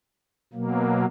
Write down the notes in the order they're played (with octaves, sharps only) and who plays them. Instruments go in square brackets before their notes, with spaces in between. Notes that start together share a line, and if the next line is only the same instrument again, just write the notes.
[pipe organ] B2 F#3 A#3